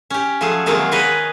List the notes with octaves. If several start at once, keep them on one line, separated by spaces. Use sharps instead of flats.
C#4 G4
F3 F#3 A3 G#4 A4
C3 D#3 F#3 G#3 A#3 C4
G#4 A#4 B4 C#5 D#5